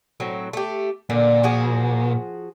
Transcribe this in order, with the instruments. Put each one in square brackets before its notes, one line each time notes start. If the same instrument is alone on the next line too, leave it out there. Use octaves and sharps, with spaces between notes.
[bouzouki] A2 F#3 C4
A3 G4
[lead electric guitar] A#2 [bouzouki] D3
[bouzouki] F3 F#4 G#4